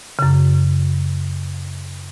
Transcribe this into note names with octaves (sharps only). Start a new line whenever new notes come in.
F#2 C#3